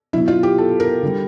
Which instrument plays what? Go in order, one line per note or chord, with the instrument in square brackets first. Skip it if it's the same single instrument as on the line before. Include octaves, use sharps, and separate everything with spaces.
[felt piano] B2 F#3 E4
F4
G4
A4
A#4
D3 G3